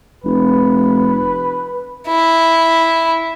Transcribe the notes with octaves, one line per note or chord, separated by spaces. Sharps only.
F1 B4
E4